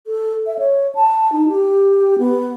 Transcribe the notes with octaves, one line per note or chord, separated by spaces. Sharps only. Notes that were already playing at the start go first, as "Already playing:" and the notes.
A4
E5
C#5
A5
D#4
G4
B3